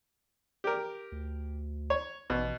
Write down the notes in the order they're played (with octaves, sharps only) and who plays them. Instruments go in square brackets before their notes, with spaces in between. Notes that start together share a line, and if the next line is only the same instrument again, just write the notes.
[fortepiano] G4 A#4
[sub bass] D2
[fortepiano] C#5
[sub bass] A1 [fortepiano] B2